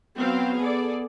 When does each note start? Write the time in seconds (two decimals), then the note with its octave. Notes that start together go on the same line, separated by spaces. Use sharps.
0.16 F#3 B3 C4 F5
0.56 G#4 A4 D5